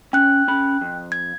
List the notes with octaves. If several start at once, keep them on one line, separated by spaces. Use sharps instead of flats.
C#4 G5 F#6
C#4 B5
F2
G#6